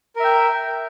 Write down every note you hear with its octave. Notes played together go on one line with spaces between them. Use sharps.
A#4 E5 G5